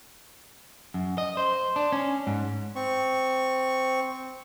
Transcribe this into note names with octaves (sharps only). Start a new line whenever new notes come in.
F#2
D#5
C5
D4
C#4
G#2
C4 C#6